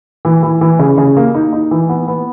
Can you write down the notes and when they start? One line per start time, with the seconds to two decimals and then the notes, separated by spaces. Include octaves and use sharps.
0.25 E3
0.43 E3
0.61 E3
0.79 C#3
0.98 C#3
1.17 A#3
1.35 D#4
1.53 D#4
1.71 E3
1.89 B3
2.08 B3